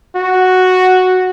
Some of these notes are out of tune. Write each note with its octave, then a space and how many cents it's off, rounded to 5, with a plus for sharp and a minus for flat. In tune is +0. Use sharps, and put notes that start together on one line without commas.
F#4 +0